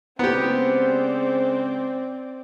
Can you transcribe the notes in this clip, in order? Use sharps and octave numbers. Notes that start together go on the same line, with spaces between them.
C#3 G#3 B3 C4 G4 C5 D5